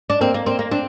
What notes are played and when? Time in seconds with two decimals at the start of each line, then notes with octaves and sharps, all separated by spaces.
0.10 D4
0.21 A#3 C4
0.34 A#3
0.46 A#3 C4
0.59 A#3
0.71 C4 D4